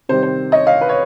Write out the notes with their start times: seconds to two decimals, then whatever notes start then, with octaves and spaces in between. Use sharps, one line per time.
0.09 C3 D#3 G3 C5
0.23 C5
0.52 C#5 D#5
0.67 D#5 F5
0.81 B4
0.89 C#5